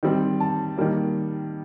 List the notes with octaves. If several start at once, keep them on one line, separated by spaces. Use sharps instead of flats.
D#3 G3 C4
A5
D#3 G3 A#3